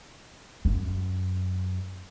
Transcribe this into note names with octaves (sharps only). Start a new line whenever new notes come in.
F#2